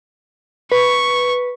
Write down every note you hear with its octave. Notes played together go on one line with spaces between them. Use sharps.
B4 C#6